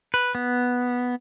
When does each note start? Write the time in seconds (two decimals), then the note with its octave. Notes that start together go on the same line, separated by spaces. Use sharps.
0.14 B4
0.35 B3